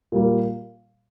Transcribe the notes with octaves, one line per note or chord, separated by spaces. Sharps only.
A#2 G3 A#3